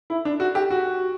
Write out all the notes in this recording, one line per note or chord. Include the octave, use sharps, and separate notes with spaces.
E4
D4
F#4
G4
F#4